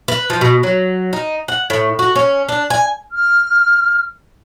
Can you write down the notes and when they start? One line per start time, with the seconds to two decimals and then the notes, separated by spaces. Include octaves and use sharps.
0.08 B4
0.30 F3
0.41 B2
0.63 F#3
1.13 D#4
1.48 F#5
1.70 A2
1.99 F#4
2.16 C#4
2.49 D4
2.70 G#5
3.11 F6